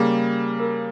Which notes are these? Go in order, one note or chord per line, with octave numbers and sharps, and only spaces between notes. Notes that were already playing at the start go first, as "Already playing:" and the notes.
Already playing: C#3 G3 A#3 G#4
A#4